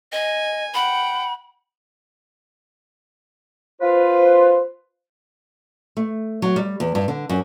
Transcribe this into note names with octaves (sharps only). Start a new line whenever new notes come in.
D#5 G#5
F#5 G5 B5
F4 B4 C5
A3
F#3
G3
E2
G2
D3
F#2